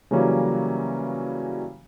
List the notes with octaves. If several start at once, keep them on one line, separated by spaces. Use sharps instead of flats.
C#3 E3 F#3 G3 A#3 C#4